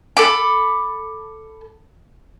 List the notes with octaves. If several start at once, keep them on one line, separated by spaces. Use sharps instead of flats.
A4 B5 D6